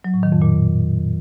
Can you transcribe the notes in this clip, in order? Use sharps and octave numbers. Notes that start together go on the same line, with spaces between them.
F#3
A2
D#3
F2
A#2